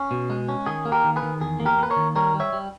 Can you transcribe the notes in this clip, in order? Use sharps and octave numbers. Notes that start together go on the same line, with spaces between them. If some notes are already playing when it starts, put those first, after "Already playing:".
Already playing: C#4 G#4
B2
G#3
C#4
D#3 G#4
A#3
G4 A#4
D#3
G#4 B4
D#3
E2 G#4
A#3
G4 A#4
A#3 B4
A#4 C#5
D#3
G3 A#4 C#5
G3
C#5 E5
G3